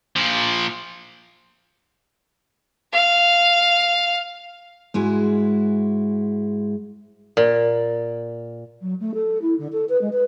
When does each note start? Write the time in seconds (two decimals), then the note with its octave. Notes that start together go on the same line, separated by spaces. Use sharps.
0.16 A#2 F3
2.93 F5
4.94 G#2 G#3 E4 F#4 G#5
7.37 A#2
8.81 F#3
9.00 A3
9.14 A4
9.42 E4
9.58 D3
9.72 A4
9.89 B4
10.01 G#3
10.12 B4